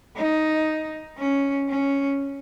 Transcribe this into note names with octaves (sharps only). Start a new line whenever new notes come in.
D#4
C#4
C#4